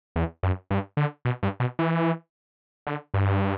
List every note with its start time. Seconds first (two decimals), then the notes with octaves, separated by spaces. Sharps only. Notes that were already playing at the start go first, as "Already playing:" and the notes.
0.16 E2
0.43 F#2
0.71 G2
0.97 D3
1.25 B2
1.43 G2
1.60 B2
1.79 E3
2.87 D3
3.14 G2